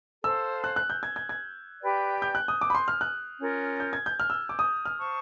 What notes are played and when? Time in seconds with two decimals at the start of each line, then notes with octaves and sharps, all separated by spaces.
0.23 A4 C5 F5 E6
0.64 F#6
0.76 F#6
0.90 G6
1.03 G#6
1.16 G#6
1.29 G#6
1.82 G4 B4 D5 G5
2.22 G6
2.35 F#6
2.48 D#6
2.61 D6
2.70 B5
2.75 C6
2.88 F6
3.01 F#6
3.40 C#4 F4 A#4
3.80 G6
3.93 G#6
4.06 G6
4.20 F6
4.30 E6
4.49 D6
4.59 D#6
4.85 F6
4.99 C5 F5 A5 C#6